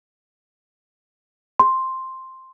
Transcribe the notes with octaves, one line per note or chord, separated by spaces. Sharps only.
C6